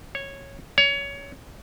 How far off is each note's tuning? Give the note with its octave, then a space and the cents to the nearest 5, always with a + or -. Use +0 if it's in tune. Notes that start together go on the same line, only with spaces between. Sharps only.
C#5 -10
C#5 +20